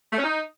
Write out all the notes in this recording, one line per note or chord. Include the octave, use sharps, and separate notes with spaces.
A3
C#4
D#4